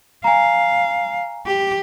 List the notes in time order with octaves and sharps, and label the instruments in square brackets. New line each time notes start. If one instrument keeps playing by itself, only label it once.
[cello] F5 [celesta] G#5 A#5
[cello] G4